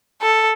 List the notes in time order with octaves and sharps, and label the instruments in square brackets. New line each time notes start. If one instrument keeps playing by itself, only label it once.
[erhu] A4